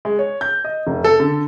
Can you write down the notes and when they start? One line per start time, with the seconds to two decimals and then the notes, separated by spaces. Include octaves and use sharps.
0.05 G#3
0.19 C#5
0.41 G6
0.64 D#5
0.87 F1
1.04 A4
1.20 D3